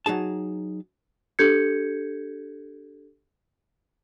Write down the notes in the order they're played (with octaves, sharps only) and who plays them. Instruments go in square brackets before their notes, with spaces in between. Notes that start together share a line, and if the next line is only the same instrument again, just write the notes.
[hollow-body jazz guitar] F#3 D#4 G#4 A5
[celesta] D4 G4 A4 G6 G#6 C#7